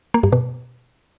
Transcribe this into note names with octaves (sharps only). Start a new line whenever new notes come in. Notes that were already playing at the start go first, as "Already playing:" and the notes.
A#3
G2
B2